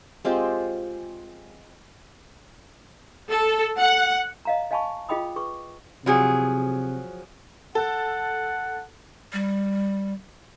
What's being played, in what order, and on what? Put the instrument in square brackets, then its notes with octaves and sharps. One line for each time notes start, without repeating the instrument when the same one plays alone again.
[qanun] G#3 C4 F4 G4
[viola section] A4
F#5
[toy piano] D#5 F5 A#5
D#5 F5 G#5 A5 B5 C#6
F4 G#4 D#5 G5 B5 D#6
G#4 B4 C#6
[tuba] C3 [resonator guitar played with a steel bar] F3 F#3 G#4
[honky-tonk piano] A4 [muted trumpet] F#5
[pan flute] G3